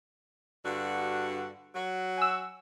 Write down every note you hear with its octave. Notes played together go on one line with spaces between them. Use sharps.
G2 D3 F#4
F#3 F#4
G#5 E6